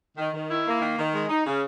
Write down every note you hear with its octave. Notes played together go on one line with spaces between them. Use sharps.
D#3
D#3
E4
A#3
D#3
D#3
G#3
D#4
C#3